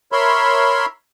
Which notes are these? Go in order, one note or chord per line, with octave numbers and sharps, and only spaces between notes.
A#4 C#5 E5 B5 C6